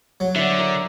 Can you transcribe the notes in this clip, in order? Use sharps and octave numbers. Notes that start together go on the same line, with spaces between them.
F#3
D3 D5 E5
A#4